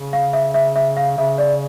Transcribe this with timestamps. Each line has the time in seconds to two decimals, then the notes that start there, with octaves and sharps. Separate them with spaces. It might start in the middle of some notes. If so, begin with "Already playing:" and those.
Already playing: C#3
0.13 F5
0.33 E5
0.54 E5
0.76 E5
0.97 F5
1.18 C#3 E5
1.38 D5